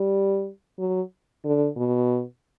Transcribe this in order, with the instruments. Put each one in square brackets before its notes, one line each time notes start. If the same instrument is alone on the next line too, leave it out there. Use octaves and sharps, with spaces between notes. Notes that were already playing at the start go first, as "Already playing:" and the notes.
Already playing: [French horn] G3
F#3
D3
B2